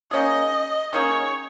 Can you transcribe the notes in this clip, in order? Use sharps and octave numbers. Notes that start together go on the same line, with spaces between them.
D#3 A#3 C#4 G#4 D#5
D#3 A#3 C#4 G#4 C#5